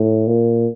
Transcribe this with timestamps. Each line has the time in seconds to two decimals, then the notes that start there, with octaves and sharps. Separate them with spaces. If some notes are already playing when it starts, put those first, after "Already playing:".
Already playing: A2
0.27 A#2